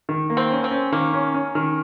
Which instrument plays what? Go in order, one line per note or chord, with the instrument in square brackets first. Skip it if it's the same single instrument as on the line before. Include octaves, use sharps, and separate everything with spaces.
[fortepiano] D#3
A#3
[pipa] C4
[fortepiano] C#4
[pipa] C4
[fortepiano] C#4
[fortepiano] D#3 [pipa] A#3
[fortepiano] C#4
C#4
D#3